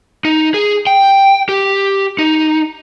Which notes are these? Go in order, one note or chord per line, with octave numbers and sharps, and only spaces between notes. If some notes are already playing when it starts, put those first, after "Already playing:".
D#4
G#4
G5
G4
D#4